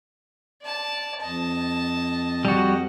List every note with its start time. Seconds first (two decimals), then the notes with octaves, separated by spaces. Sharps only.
0.63 D5 A5
1.21 F2 D#5 A5
2.45 G3 F#4